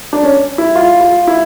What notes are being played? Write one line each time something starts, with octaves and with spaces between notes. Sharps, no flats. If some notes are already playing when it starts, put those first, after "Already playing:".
D4
C#4
E4
F4
F4
E4